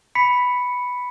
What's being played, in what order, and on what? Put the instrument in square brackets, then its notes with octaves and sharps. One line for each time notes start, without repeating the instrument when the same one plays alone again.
[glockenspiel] B5 B6 C#7